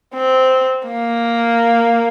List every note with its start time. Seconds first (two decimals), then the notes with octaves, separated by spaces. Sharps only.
0.14 C4
0.86 A#3